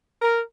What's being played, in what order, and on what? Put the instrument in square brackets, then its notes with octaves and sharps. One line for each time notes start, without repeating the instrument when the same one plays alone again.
[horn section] A#4